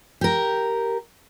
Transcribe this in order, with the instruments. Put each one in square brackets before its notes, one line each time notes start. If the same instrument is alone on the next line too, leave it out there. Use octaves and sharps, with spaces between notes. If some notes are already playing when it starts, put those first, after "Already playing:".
[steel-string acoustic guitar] G4 A#4